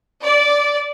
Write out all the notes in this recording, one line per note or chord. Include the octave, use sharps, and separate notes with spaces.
D5